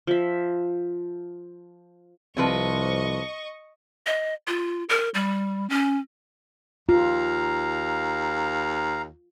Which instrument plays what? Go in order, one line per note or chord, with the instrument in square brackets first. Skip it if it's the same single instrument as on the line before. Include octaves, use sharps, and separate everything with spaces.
[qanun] F3 E5
[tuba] C2 [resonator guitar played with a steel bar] C3 F3 B4 [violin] D#5 C#6
[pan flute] D#5
F4
A#4
G3
C#4
[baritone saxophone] D#2 [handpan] F4 [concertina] F5 A#5